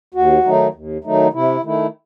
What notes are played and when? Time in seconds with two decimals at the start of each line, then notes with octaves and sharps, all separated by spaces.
0.14 D#2 F#4
0.45 D#3 F#3 A3 D#4
0.74 D#2
1.04 D#3 F#3 A3 D#4
1.33 C3 E4
1.63 D#3 A3 E4